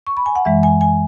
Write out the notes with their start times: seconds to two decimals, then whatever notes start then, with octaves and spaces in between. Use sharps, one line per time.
0.07 C#6
0.17 B5
0.26 G#5
0.35 F#5
0.45 F#2 E3 G#3 E5
0.63 G#5
0.81 G#5